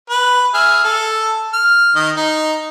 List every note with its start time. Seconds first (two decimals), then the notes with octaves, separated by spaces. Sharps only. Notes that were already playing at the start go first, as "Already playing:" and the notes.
0.10 B4
0.54 G#4 E5 F6
0.84 A4
1.53 F6
1.96 D#3 D#5
2.17 D#4